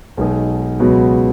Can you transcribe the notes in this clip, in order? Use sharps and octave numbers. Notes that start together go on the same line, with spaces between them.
B1 B2 G#3 D#4 G#4
C#2 B2 F#3 B3 F#4